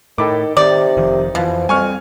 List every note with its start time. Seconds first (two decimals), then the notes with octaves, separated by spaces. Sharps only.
0.18 A2 D#3 A4 B5 D6
0.57 C3 D#3 D#4 D5
0.97 F1 D#3 F3
1.35 F2 B2 E3 F3
1.69 F2 G3 C4 G#5 C#6 F6